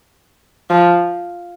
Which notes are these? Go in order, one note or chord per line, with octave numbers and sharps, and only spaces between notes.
F3